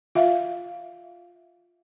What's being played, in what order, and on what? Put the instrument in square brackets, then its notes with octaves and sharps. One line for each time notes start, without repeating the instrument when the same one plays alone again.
[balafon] F4 E5 F5